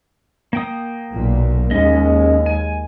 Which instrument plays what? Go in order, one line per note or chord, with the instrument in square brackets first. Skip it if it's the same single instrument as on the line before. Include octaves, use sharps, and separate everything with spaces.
[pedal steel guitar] A#3 G5 D#6
[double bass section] B1 A#2
[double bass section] D#2 G#3 [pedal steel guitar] C#4 D#5
[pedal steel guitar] G#5